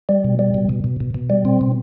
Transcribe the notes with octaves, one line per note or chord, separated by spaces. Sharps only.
G3
B2
G3
B2
B2
B2
B2
B2
G3
C4
B2